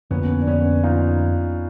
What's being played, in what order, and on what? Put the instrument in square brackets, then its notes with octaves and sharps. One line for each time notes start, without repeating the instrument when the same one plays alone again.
[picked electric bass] F2 D3 F3 A#3 [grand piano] B3 C#4
[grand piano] D4
B3 C#4
D#4 F4